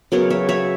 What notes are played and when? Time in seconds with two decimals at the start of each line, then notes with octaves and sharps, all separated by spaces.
0.12 C#3 F#3 B3 A#4 C#5
0.30 C#5 E5
0.49 C#5 E5